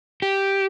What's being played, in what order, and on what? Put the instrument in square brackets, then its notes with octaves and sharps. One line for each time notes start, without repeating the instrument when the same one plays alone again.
[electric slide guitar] G4